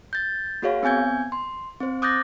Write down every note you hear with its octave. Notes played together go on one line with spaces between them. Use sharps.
G6 A6
A#3 F#4 G#4 C#5 F5
B3 C4 G#5 G6 G#6
C6
C4 C5
D6 D#6 F#6 G6 A6 A#6